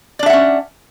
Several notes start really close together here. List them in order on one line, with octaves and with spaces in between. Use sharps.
D5 D4 E5 F#5 C#4